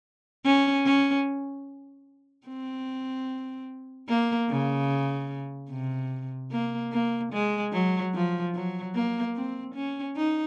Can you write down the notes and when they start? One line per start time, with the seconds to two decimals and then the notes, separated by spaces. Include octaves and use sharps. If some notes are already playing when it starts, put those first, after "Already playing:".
0.45 C#4
0.86 C#4
2.47 C4
4.09 A#3
4.50 C#3
5.70 C3
6.52 A#3
6.93 A#3
7.33 G#3
7.73 F#3
8.14 F3
8.55 F#3
8.95 A#3
9.35 C4
9.75 C#4
10.16 D#4